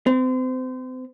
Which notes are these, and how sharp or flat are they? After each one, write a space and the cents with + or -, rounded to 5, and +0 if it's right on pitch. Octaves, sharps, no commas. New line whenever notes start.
C4 -35